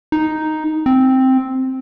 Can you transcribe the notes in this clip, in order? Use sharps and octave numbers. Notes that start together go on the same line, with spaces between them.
D#4
C4